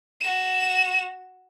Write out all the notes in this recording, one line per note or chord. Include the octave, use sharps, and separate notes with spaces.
F#4 E7